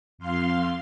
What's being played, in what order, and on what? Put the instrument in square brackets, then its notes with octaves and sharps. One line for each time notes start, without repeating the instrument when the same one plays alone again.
[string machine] F2 F5 C6